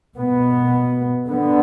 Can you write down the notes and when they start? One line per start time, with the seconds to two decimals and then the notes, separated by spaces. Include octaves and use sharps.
0.16 B2 B3
1.26 D3 B3